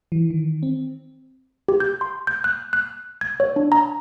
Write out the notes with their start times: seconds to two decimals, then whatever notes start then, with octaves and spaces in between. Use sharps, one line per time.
0.12 E3
0.30 D#3
0.63 C4
1.68 G4
1.80 G6
2.01 C6
2.27 G6
2.44 F#6
2.73 F#6
3.21 G#6
3.40 C#5
3.56 D4
3.72 A#5